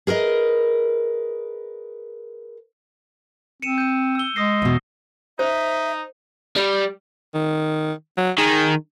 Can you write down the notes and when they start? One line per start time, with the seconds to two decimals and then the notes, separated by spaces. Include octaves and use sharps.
0.07 G#4 A#4 B4 D#5
3.62 C4 C#7 D#7 E7
3.78 G6 D#7
4.15 E6 G7
4.36 G#3 D#6 A#6 C7
4.62 E2 B2
5.39 D#4 C5 E5
6.56 G3
7.34 D#3
8.18 F#3
8.38 D#3 G#4